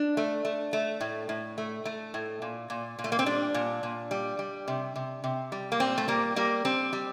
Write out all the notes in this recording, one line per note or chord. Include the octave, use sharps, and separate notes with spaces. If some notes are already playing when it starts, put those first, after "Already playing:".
Already playing: D4
A3
A3
A3
A2
A2
A3
A3
A2
A#2
A#2
A#2
A3
A#3
C4
G3 D4
A#2
A#2
G3
G3
C3
C3
C3
G3
A#3
A#2 C4
A3
G3 A#3
G3 A#3
G3 C4
G3